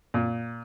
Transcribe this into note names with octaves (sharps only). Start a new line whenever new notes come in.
A#2